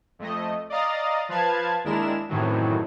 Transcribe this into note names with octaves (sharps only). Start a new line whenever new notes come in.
F2 A3 D#5
D5 D#5 F5 A#5 D#6 A6
F3 B4 F5 A5 G#6
D#2 G#3 D4 E4 A#4 E7
F#2 A2 C3 D#3 E3 F#3